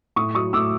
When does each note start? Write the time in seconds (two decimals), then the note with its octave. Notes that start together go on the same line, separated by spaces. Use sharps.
0.16 A2 C#6 D#6
0.35 F#3 C#6 D#6
0.53 A2 D6 E6